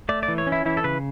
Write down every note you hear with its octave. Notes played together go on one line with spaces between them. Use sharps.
A3 D5
D5
E3
C#5
C#4
E4
E3 E4
A4
C#3 B4